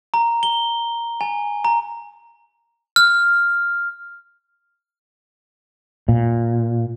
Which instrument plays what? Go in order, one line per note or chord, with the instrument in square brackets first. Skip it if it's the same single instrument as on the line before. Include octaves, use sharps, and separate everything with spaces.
[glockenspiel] A#5
G7
G#5
A#5
F6
[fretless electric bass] A#2